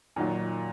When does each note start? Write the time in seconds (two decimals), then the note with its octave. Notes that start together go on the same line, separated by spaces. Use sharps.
0.16 A#2 D#3 F#3